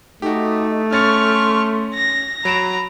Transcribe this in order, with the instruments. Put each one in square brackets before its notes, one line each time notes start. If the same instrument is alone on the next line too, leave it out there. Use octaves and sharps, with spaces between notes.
[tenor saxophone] A3 [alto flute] D#4 [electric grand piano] F#4 G4
[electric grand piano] C#4 A6 C#7 [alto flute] C6 [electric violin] C#6 F6
[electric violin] A#6
[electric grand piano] F#3 D7 E7 [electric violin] A#5 [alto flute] B5